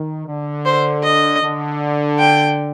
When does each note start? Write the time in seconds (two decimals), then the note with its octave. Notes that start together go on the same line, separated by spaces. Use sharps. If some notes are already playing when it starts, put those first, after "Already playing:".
Already playing: D#3
0.28 D3
0.65 C5
1.04 D#5
1.42 D3
2.19 G5